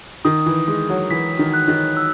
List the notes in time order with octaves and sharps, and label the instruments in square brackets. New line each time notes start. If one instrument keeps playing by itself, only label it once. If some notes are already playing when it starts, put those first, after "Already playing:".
[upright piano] D#3 [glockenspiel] D#6
[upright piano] E3
[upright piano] G#3 [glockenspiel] D#6
[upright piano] F#3
[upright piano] E3 [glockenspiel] B6
[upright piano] D#3
[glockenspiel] F#6
[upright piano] D#3
[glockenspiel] E6